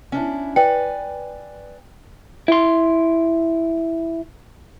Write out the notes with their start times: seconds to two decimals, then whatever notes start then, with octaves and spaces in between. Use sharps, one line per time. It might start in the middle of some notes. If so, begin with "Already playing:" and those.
0.12 C#4 D4 E4
0.56 B4 D5 G5 G#5
2.48 E4 C6